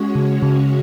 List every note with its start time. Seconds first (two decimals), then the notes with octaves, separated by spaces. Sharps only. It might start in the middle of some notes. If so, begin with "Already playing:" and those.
Already playing: G#3 C#4 F#4 C#5
0.15 C#3
0.43 C#3